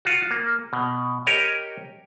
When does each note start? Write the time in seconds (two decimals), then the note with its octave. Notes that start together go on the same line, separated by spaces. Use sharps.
0.05 F4 F#4
0.31 A#3
0.73 B2
1.26 G4 A#4 C#5 D#5